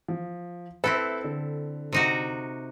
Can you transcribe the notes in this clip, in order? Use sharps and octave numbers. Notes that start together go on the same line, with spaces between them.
F3
C4 E4 A4 B4 E5
D3
C3 D#4 F#4